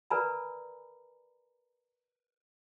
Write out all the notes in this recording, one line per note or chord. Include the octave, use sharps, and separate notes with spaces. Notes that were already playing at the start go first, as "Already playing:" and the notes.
A#4 B4 D5 G#5 A#5 B5